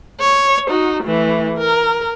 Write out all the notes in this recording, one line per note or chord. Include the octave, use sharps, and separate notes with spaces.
C#5
D#4 F#4
E3 A3
A#4